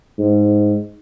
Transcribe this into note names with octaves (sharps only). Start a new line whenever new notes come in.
G#2